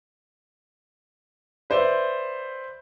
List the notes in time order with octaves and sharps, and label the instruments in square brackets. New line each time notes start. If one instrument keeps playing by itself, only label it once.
[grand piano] B4 C5 D5 E5